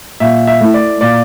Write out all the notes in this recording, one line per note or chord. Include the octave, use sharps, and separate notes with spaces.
A#2 E5
E5
A3 E4
D5
A#2 D5